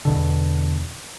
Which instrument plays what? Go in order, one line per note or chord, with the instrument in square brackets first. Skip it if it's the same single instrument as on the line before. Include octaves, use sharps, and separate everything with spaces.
[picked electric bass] E2 B2 D3